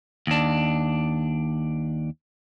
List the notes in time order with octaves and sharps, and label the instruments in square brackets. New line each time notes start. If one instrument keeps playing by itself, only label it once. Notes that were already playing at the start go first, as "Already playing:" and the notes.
[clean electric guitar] D#2 D4